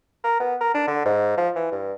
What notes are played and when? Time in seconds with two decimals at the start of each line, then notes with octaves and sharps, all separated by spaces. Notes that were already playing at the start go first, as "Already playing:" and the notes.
0.24 A#4
0.40 B3
0.61 A#4
0.75 D4
0.88 D3
1.05 G#2
1.38 F3
1.56 E3
1.72 G2